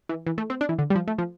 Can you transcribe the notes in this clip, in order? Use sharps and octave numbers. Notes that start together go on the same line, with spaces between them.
E3
E3
A3
C4
D4
E3
D3
G3
F3
A3
F3